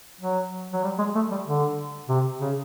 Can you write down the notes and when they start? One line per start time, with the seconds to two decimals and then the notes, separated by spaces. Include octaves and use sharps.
0.21 F#3
0.73 F#3
0.84 G3
0.99 G#3
1.15 A3
1.31 G3
1.46 D3
2.09 C3
2.41 C#3